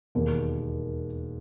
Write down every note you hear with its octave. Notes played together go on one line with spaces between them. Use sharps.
E1 D#2 D#3